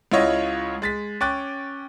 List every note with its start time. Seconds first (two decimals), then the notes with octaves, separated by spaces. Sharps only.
0.12 C#2 E4 F4 C#5 D#5 F#5
0.82 G#3 A6 B6
1.21 C#4 G5 C#6 D6 F#6 A6